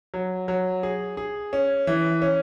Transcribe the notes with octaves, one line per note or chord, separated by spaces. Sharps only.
F#3
F#3
G#4
G#4
C#4
E3
C#4